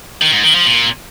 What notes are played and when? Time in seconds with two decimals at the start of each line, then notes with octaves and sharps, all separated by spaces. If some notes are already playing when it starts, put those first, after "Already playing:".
0.22 D#3
0.33 G#2
0.44 D#3
0.55 F3
0.66 A#2